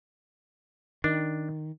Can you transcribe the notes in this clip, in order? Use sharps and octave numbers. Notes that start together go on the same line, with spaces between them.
D#3 D4